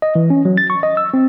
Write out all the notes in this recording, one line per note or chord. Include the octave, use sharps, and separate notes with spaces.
D#5
E3
C#4
F#3
A6
C#6
D#5
E6
C4